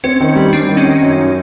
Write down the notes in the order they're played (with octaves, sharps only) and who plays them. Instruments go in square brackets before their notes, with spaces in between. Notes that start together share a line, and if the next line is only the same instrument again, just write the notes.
[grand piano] C4 [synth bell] C#4
[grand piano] D#3
G3
[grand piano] G3 [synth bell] C4 D4
[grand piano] D#3
[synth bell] C#4 D#4
[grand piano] D#3
F#2
F#3